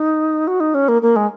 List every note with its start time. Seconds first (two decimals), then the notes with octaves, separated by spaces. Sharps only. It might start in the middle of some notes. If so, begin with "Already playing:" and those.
Already playing: D#4
0.47 F#4
0.60 D#4
0.74 C#4
0.88 A#3
1.02 A#3
1.16 G#3